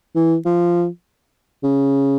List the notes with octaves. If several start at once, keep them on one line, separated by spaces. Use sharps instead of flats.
E3
F3
C#3